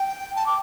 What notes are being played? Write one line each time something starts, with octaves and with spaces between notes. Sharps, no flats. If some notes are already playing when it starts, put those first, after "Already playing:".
Already playing: G5
A5
D6